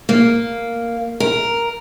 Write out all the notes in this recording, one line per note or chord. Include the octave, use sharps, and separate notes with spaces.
A#3
A#4